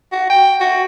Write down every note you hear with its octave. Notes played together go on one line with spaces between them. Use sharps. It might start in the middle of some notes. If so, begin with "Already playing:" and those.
F#4
G5
F#4